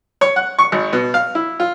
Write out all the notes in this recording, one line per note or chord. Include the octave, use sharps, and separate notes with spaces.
C#5
F#5
C#6
G#1
B2
F5
E4
F4